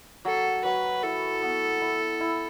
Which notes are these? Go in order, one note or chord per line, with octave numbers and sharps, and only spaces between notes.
F#3 A4
F#3 B4
E4 A4
B3
E4
E4